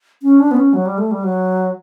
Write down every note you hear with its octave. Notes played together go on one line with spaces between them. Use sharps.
C#4
D4
B3
C#4
F#3
G3
A3
G3
F#3